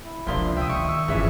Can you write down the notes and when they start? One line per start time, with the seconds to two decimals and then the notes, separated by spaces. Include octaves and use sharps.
0.05 E4
0.27 C#2 C3 F3 A#3 D4 E5 C6
0.56 E5 G5 D#6
0.69 D#3 C#6
0.89 E6
1.08 G1 C#3 E3 F3 G#4 E5